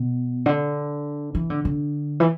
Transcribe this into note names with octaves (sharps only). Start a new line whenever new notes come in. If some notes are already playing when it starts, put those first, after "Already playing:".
Already playing: B2
D3
E3
D3
D3
E3